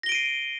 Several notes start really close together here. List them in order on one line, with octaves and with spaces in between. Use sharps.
A#6 G7 D7 D#7 C7